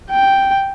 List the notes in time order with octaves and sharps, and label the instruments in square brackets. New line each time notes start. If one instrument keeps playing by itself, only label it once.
[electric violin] G5